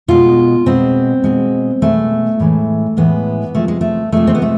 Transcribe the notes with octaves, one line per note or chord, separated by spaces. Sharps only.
B2 G#3 F4
B2 G#3 C4
B2 G#3
B2 G#3 A3
A2 E3 G#3
A2 E3 G#3 B3
C3 F3 G#3 A3
G#3
A3
C3 F3 G#3 A3
C4
B3
A3